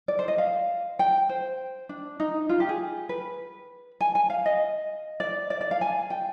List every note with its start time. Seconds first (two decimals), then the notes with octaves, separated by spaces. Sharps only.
0.08 D5
0.19 C5
0.28 D#5
0.38 F5
0.99 G5
1.29 C5
1.89 D4
2.20 D#4
2.49 F4
2.60 G4
2.69 G#4
3.09 B4
4.01 G#5
4.15 G#5
4.30 F5
4.46 D#5
5.20 D5
5.50 D5
5.61 D5
5.71 F5
5.81 G#5
6.10 G5